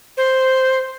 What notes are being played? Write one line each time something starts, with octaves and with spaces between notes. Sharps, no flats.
C5